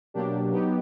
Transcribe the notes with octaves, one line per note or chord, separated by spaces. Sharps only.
B2 F#3 A#3 D4 G4
F#3 B3 D#4 G4